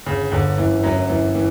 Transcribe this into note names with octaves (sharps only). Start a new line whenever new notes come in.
G1 C#3
G1 D3
F#2 E3
F#2 F#3
F#2 E3
E3